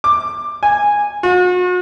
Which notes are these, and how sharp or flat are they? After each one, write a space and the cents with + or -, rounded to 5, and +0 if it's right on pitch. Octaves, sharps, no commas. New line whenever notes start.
D6 +10
G#5 -10
F#4 -40